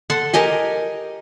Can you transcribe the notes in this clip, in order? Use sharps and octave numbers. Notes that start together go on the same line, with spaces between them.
A4 F#5 C6
G4 A#4 D#5 G#5